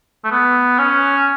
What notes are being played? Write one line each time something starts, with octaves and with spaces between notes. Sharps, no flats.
A3
B3
C#4